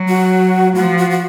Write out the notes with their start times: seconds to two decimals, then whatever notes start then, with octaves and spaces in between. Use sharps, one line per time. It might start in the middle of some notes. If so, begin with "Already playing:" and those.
Already playing: F#3
0.08 F#4
0.75 F3 F#4
0.98 F#4
1.11 F#4